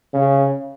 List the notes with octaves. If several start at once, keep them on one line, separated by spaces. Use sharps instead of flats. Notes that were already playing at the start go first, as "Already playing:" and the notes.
C#3